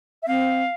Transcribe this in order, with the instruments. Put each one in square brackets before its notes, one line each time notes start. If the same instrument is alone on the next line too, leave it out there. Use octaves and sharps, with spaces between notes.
[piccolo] E5
[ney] C4 [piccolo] F5